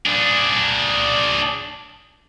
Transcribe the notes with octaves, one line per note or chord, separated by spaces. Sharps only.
D4 G#4